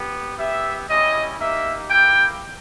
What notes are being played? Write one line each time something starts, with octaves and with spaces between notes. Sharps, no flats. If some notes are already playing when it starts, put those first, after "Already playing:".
Already playing: B3 G4
B3 G4 E5
G3 C#4 E4 G4 D#5
A#3 D#4 G4 E5
A#3 E4 G4 G5